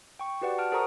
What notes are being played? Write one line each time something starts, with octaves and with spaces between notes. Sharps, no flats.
G5 C#6
F#4 G4 B4 D5 F#5
F#5 A5 F6 D7
G#4 A#4 C5 A#5 C#6 D#6